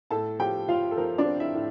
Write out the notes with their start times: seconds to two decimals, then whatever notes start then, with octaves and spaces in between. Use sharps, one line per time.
0.11 A2 A4 A5
0.39 F3 G4 G5
0.68 F3 F4 F5
0.91 A4
0.97 F3 A#4
1.18 D4 D5
1.26 C4
1.40 E4 E5
1.55 A2